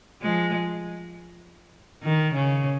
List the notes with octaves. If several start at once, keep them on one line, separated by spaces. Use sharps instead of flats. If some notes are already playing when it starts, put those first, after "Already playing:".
F3 G#3
D#3
C#3